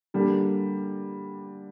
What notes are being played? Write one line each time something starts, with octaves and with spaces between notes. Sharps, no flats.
D3 G3 A#3